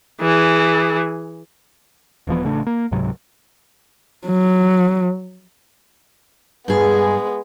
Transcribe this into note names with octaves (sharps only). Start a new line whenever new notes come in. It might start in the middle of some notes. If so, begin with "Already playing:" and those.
E3 G#4
D#1 E3 F3 B3
A1 C#3 A3 D4
A#3
C#2 G#2 C3 F#3
F#3
G2 G#3 B3 G#4